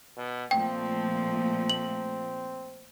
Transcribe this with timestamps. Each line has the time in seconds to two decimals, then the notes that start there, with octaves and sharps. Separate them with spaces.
0.17 B2
0.51 A#2 F3 A3 C4 G5
1.70 F#7